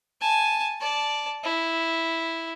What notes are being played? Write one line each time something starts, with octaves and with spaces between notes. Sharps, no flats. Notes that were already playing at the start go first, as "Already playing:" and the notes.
G#5 A5
D5 A5
E4